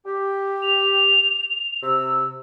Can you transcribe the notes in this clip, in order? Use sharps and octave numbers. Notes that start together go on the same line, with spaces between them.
G4
F7
C3 E6